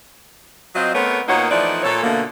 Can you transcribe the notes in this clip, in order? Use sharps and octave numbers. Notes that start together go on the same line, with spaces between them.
F#3 C4 F4 C5 D#5
A3 B3 C4 A#4 B4 C#5
A#2 A#3 B3 D#4 C#5 F#5
E3 F3 A3 D#4 D5
A#2 A4 C#5
B2 D3 A3 A#3